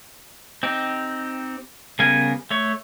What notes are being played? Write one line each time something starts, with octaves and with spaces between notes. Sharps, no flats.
C4 D#4 G4
C#3 G3 B3 A#4 G#5
A3 C#5